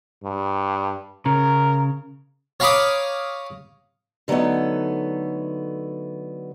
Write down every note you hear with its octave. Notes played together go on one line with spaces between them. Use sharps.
G2
C#3 A#4
C#5 F5 A#5 B5 D6 D#6
D3 F#3 A3 B3 D#4